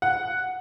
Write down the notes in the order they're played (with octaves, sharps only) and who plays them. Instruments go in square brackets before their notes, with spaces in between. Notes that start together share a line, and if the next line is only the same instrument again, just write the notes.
[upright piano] F#5